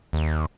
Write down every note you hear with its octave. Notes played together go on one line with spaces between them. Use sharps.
D#2